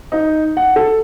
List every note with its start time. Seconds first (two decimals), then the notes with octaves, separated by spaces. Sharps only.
0.12 D#4
0.57 F#5
0.76 A4